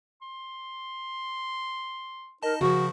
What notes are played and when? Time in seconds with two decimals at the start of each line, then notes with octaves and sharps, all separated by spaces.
0.22 C6
2.43 D#4 A#4 D#5 A5
2.61 C#3 F3 F#4 A#4 C#6